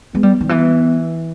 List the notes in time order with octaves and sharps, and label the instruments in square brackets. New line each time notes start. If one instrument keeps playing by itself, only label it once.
[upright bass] G#3 [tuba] B3
[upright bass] G3
D#3
[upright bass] E3 [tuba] B3